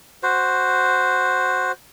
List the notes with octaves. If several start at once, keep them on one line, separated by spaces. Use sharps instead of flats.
F#4 C5